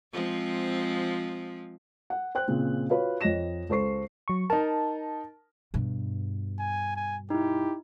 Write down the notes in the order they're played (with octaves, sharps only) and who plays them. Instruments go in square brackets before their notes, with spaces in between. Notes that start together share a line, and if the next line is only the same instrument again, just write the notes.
[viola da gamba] F3 G#3 C4
[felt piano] F#5
C5 G5 F#6
A#2 C#3 C4
F4 F#4 B4 C#5 F5
F2 C#5 D#5 A#6 E7
C#2 A4 C5 C#6 C7
[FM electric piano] F#3 C#6
[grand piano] D#4 A#4 [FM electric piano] A5
[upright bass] G2 B2
[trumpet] G#5
G#5
[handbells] D#4 E4 [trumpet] G4